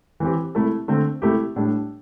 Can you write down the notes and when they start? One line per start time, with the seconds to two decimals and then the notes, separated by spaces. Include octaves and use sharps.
0.20 E3 C4 G4
0.55 C3 A3 E4 A4
0.88 D3 A3 C4
1.22 C3 A3 E4 G4
1.56 A2 G3 D4